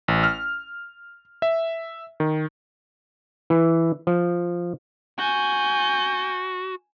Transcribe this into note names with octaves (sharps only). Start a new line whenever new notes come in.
A1
F6
E5
D#3
E3
F3
F#4 G#5 G6